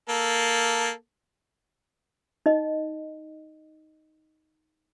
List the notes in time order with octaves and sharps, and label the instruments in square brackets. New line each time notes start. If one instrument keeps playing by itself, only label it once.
[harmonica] A#3 A4
[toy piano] D#4 D#5